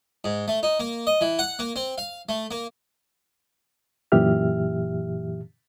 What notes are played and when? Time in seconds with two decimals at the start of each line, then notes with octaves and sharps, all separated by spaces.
0.24 G#2
0.48 A3
0.63 D#4
0.80 A#3
1.07 D#5
1.21 E3
1.39 F#5
1.59 A#3
1.76 C4
1.98 F5
2.29 A3
2.51 A#3
4.12 F#2 A#2 E3 G4 E5 F6